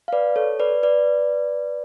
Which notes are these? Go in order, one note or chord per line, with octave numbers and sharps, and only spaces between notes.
F5
B4 D5
A4 C#5
B4 D5
B4 D5